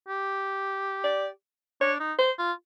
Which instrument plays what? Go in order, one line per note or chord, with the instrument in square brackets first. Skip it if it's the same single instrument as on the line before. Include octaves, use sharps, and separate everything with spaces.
[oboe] G4
[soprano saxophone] D5
[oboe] D4 [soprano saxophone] C#5
[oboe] D#4
[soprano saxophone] C5
[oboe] F4